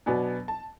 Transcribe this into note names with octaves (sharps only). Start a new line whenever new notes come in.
B2 F#3 B3 D4 G#5
A5